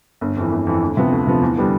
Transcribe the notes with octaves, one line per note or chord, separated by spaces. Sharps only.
G1
F2 E3
G1
F2 E3
D2
C3 F3 B3
D2
C3 F3 B3
E2
D3 G3 B3 D4